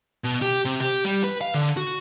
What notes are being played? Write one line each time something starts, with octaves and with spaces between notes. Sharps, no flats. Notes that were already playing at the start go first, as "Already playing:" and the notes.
B2
G4
C3
G4
G3
B4
F5
D3
F#4